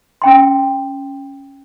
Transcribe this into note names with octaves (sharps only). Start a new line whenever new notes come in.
C#4 G5 C6